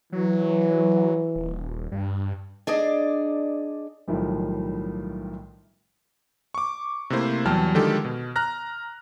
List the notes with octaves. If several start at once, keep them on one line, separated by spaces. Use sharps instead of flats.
E3 F#3
D#1
G2
D4 G#4 D5 D#5
B1 A2 D#3 F3 G3
C#6 D6
C3 A3 A#3 E4 C5
E2 F#3 G3 G5 A5 F6
D3 D#3 F3 G#3 G4 A4
B2
A#5 F6 F#6 A#6